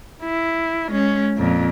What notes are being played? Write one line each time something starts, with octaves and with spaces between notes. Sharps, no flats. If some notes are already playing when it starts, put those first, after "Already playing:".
E4
G#3 C#4
F2 A#2